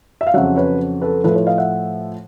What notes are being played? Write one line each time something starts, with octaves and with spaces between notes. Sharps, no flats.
E5
F5
F2 C#3 F#3 E5 F#5
B4 C#5
A4 B4
A2 F3 A4 B4
B4 C#5
D#5 F5
E5 F#5